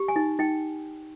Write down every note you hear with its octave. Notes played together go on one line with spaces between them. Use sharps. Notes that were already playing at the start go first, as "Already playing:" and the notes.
Already playing: G4
G#5
D#4
D#4 G5